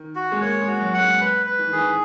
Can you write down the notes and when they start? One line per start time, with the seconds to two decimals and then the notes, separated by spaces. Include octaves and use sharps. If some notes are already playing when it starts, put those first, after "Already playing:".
Already playing: D#3
0.15 F#4
0.32 G#3
0.41 A#3 C#5
0.62 G#3
0.68 F#4
0.81 F#3
0.94 F#5
1.00 G#3
1.20 B4
1.46 B4
1.59 E3
1.69 D#3 G#4
1.78 E3